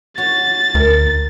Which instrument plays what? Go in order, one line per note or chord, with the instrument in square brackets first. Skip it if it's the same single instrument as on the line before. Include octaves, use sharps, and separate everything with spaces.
[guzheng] F#4 C#5 [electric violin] A6
[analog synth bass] D2 [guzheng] A#4